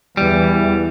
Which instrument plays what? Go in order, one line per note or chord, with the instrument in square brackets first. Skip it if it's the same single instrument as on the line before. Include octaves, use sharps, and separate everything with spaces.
[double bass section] E2 E3 [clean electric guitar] G3